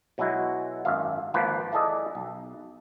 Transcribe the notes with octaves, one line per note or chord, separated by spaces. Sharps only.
B2 F#3 G#3 E4 F#4
G#1 F#2 E5 F5
G#1 F3 A#3 B4 G5
E4 G#4 A4 D5 D#5
B1